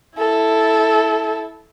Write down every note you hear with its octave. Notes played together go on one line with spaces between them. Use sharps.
E4 A4